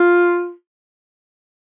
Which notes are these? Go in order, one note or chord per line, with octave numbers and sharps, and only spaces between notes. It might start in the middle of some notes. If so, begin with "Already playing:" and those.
Already playing: F4